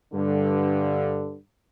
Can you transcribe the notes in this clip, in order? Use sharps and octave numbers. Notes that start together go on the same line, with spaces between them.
G2 D3